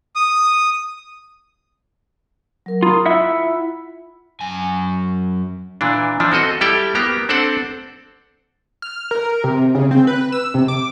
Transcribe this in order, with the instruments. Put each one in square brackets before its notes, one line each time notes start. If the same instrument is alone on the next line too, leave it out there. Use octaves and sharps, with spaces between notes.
[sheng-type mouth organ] D#6
[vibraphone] F#3 A#4
[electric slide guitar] F4 [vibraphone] A#5 B5 D#6
[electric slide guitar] E4 E5 F#5 [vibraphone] F4 B5
[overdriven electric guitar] F#2 G#5
[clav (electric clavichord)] A#2 E3 D4
E3 F3 D4
C4 F#4 A4 D#5
G3 E4 G4 A4 D5 G5
A#3 B3 G4 A#5
C4 D4 A4 C5 D5 F#5
[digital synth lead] F6
A#4
C3
C#3
C4
B4
E6
C3
D6